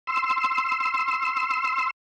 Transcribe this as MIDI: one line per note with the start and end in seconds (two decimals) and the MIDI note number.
0.07 1.90 84
0.07 1.90 88